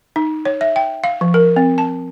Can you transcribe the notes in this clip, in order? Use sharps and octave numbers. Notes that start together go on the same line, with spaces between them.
D#4
C#5
E5
G5
F5
F3
A#4
C4
A5